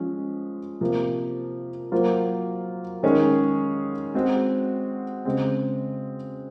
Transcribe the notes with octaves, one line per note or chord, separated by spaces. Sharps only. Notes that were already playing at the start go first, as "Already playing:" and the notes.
Already playing: F3 G#3 C#4
C3 F3 A#3
F#3 A#3 F4 C5
D#3 G#3 C#4 G#4 C#5
G#3 C4 F#4
C#3 G#3 C4